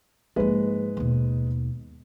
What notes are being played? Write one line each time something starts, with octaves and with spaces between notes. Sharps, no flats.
G#2 F3 G#3 A#3 B4
D#2 B2